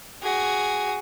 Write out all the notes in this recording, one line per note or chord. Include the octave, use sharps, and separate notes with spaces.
F#4 G#4